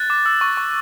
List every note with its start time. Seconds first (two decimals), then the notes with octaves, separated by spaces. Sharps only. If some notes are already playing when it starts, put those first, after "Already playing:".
Already playing: F#6 A6
0.10 D6
0.26 E6
0.41 C#6
0.57 C#6